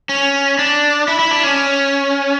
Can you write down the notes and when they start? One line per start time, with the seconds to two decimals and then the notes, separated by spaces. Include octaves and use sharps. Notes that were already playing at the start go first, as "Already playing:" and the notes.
0.09 C#4
0.59 D4
1.08 E4
1.19 E4
1.31 D4
1.44 C#4